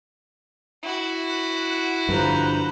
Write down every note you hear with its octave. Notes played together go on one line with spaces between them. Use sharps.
E4 F#4
F#6
G2 D3 F3 B4 A#5 G6